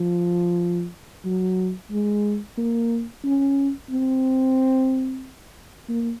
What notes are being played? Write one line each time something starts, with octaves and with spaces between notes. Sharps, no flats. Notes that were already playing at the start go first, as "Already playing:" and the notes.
Already playing: F3
F#3
G#3
A#3
C#4
C4
A#3